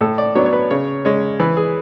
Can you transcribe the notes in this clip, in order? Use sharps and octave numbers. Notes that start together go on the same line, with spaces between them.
A2 A4
D5
F#3 B3 D4 C#5
C#5
B4
C#3 C#5
G#3 C#4 C#5
E3 B4
G#4